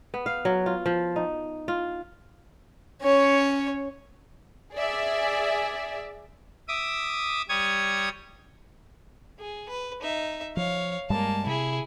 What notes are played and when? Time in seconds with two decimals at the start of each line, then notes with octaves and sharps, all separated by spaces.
0.14 B3
0.26 F5
0.45 F#3
0.66 F4
0.86 F3
1.16 D#4
1.68 F4
3.02 C#4 C#5
4.74 G#4 D5 E5
6.68 E5 D6 D#6
7.49 G3 C#5 D#6 G#6
9.40 G#4
9.69 B4
10.01 D#4 E5
10.57 F3 C#5 F5
11.10 G2 G3 G#3 A#3 A5
11.46 C3 E4 G#4